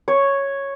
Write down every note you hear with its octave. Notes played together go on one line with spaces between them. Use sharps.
C#5